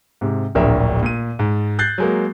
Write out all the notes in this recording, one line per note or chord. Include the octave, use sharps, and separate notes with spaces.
G#2 C3
D1 A#1 A#4 E5
A#2 D#7
G#2
F#6 G6 A6 C7
F#3 G#3 A#3